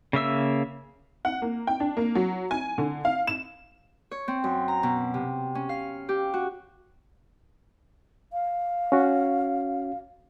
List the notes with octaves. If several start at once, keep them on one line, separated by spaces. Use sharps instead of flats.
C#3 A#3 E5 E6
F#5
A#3
G5
D4
A#3
F#3
G#5
D3
F5
E7
C#5
C4
F#2
A#5
B2
C3
C#4
F5
G4
F#4
F5
C#4 F#4